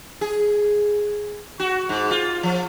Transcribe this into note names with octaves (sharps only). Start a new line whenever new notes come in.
G#4
F#4
G#2
F4
F3